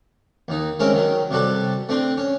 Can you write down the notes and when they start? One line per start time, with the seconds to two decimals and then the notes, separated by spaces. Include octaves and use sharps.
0.48 D#2 D#4
0.80 G#3 C4 C#4 A#4 E5
0.93 D#3 F#3
1.31 C3 G3 F#4 A4 A5
1.89 A3 C4 D4 C6
2.18 C#4